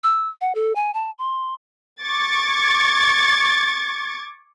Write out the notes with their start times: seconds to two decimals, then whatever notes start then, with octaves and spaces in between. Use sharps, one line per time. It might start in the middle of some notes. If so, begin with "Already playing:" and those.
0.04 E6
0.41 F#5
0.55 A4
0.75 G#5
0.94 A5
1.19 C6
2.04 C#6 D6 G#6 A6